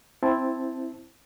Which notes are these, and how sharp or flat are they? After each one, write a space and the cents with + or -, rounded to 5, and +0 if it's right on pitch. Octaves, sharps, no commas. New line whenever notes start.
C4 +0 E4 +0 A5 +0